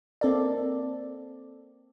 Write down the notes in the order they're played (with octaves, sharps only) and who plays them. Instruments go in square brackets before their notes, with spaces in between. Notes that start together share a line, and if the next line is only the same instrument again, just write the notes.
[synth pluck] A#3 C4 A4 D5